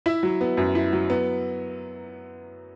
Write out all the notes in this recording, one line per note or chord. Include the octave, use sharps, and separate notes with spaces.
E4 E5
F#3
B3
F#2
E4
F#3
B3